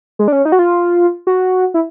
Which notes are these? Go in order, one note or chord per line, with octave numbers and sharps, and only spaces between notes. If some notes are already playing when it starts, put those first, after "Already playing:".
G#3
D4
C#4
D#4
F#4
F4
F#4
E4